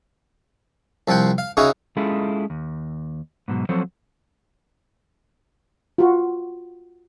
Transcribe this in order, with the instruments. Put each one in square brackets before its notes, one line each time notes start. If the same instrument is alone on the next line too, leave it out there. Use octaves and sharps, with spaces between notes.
[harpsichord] C2 F3 C4 F#5 G5
F5
C#3 C#4 D#4 E4 F#4 G#4
[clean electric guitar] G#3 C#4 E4 F4 G#4 A4
D#2
G#2 B2 F#3
F3 F#3 C4 A4 C5 C#5
[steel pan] F4 F#4